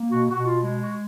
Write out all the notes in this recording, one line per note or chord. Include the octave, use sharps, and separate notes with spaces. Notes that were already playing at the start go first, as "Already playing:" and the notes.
Already playing: A#3
B2 F#4
F#4
B2
F4
G#3
F#4